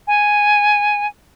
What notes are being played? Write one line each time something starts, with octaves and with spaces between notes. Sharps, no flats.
G#5